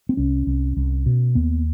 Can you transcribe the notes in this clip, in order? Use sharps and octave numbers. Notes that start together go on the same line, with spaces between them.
C4
C2 C#4
C2
C2
B2
D#2 B3